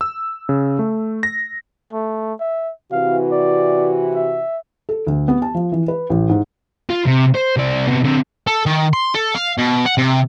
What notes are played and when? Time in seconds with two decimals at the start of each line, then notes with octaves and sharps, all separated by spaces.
0.01 E6
0.49 C#3
0.79 A3
1.23 A#6
1.92 A3
2.40 E5
2.92 C3 E3 F#4 F5
3.32 D5
4.14 E5
4.89 A4
5.07 D2
5.28 B3
5.42 A5
5.54 F3
5.72 E3
5.88 B4
6.10 A1
6.29 G#2
6.90 F4
7.07 C3
7.35 C5
7.57 C2 D5
7.87 C3 B3
8.03 D3 C4
8.47 A4
8.66 D#3
8.93 C6
9.14 A4
9.34 F5
9.58 B2
9.86 F#5
9.98 C3